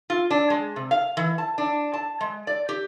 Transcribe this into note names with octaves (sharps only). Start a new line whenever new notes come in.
F4
D4
G#3
C3
F5
E3
A5
D4
A5
G#3
D5
G4